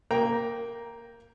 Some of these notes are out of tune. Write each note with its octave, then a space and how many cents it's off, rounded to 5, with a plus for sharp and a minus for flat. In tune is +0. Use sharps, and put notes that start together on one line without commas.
A#3 +0 G5 +0 A#5 +5